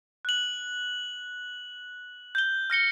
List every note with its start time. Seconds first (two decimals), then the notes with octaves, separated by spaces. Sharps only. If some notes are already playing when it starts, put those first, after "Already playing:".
0.25 F#6 F#7
2.35 G6 G7
2.70 F6 A#6 C#7 G7